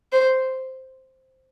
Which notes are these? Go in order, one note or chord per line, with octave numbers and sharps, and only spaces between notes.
C5